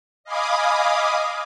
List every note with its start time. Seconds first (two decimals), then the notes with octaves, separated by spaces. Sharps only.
0.24 D#5 F5 G#5 B5 D6 D#6